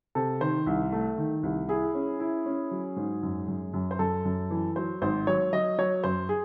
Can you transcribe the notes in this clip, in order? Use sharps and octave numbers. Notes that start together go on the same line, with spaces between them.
C3 A4
D#3 C5
C2
A3
D#3
C2
E4 G#4
C#4
E4
C#4
F#3
G#2
F#2
F#2
F#2
C5
F#2 A4
F#2
E3
F#3 C5
G#1 C5
F#3 C#5
F#3 D#5
F#3 C#5
F#2 C5
G#4